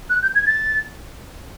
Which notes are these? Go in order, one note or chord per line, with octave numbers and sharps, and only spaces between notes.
F#6
G6
G#6
A6